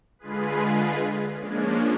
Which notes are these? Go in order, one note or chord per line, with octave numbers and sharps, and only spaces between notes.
D3 G#3 F4 G#4 B4
F3 G#3 A#3 C#4 D4